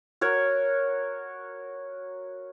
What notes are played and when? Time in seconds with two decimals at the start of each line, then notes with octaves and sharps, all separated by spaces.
0.21 F#4 A#4 C#5